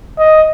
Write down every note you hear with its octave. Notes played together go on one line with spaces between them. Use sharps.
D#5